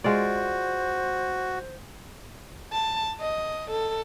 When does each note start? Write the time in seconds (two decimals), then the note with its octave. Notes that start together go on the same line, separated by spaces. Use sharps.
0.04 G#3 F4 F#4 C5 D5
2.72 A5
3.20 D#5
3.71 A4